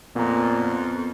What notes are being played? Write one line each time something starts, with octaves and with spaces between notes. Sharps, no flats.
F2 A#2 B3 A#5